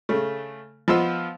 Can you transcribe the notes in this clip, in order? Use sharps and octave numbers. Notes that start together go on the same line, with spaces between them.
C#3 A3
F3 B3 F4 C5 D#5 E6